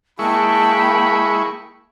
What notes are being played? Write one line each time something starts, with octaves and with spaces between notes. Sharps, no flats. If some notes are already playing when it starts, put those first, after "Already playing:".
G#3 A#3 E4 G5 A5 B5 C#6